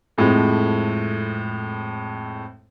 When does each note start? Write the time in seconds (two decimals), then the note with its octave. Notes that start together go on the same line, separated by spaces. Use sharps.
0.18 F2 A2 F3 G#3